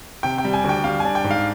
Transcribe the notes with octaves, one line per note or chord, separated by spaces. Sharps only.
C3 G5
G5
G3
G#5
D2
G5
G3 F5
D4 G#5
G5
G#2
F5